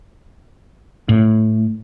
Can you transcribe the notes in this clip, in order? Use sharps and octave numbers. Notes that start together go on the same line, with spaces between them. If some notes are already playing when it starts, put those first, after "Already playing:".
A2